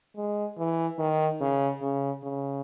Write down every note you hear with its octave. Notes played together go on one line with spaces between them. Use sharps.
G#3
E3
D#3
C#3
C#3
C#3